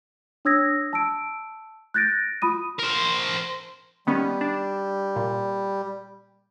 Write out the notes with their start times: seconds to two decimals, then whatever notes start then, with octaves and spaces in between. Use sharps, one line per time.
0.45 D4 C#5 D#6 E6 G#6 A#6
0.93 A5 E6 D7
1.94 F#6 G6 A6 A#6 D7
2.42 F4 B5 D#6 D#7
2.79 A#4 C5
4.07 D#3 G3 B3 C#4
4.41 D4
5.16 A#2